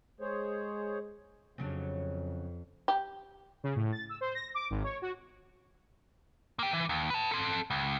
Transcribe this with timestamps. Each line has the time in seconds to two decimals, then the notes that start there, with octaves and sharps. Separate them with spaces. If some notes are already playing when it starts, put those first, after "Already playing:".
0.21 G#3 G#4 C5 C#5
1.58 F2 C#3 F#3 D4
2.88 G4
3.64 C#3
3.76 A2
3.92 A6
4.09 E6
4.21 C5
4.35 A#6
4.54 D6
4.70 G#1
4.84 C#5
5.02 F#4
6.59 A#3 G5
6.73 E3
6.89 D#2
7.10 B4 A5
7.32 C4 A4
7.70 C#2